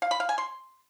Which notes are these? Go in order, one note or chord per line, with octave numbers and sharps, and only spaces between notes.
F5
B5
F5
G#5
C6